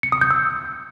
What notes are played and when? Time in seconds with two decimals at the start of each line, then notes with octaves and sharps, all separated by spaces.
0.03 C#7
0.12 D#6
0.21 G6
0.31 E6